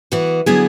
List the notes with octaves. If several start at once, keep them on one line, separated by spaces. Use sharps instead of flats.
E3 B3 F#4
D3 F#3 B3 E4 G#4